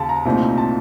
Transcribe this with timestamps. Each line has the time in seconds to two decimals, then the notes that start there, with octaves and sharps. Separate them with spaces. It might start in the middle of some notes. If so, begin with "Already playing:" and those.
Already playing: D#2 C#3 A5
0.09 A#5
0.25 C2 A#2 A3 C4 D#4
0.58 A5